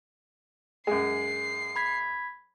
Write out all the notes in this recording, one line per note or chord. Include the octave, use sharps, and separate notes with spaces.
F#2 G#3 C7
B5 G#6 B6